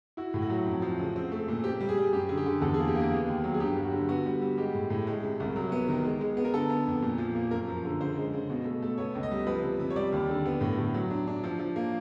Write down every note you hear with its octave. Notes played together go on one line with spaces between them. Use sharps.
E4 F#4
A2
F#4
F#3
F2
F3
C#3
C4
A3
A#2
C4 G4
G3
G#4
G3
F#2 G4
D3 G#4
G4
D3
E2 A4
A#3 G#4
G4
A#3
G#4
B3
D#2
F#3
G#4
G2 G4
F#3
F#4
D3
B3 F#4
G3
G3
G#3 G4
A2
A2
G#3
C3
C2
F#3
B3
D#3
G#3
G#3
B3
A#4
D3 A4
B3
F2
A#2
F3
A#3
F#2 A#4
F3
D3
C#3 C5
G#3
C#3
B2
A3
A3
B3 C#5
C#2
D#5
G3
F3 B4
C3
C3
C#5
G3 D5
D#2
D3
B3
A2
A2
F#3
D4
D4
F3
F3
A#3